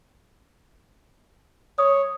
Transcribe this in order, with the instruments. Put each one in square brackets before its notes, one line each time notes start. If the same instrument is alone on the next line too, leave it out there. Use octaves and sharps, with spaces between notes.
[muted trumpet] C#5 [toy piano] D#6